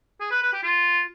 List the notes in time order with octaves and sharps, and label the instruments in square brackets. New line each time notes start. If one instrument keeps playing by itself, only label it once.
[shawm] G#4
B4
B4
G4
F4